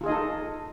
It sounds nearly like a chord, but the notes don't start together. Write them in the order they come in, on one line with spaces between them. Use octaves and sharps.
F4 G#4 D#5 D#4 A4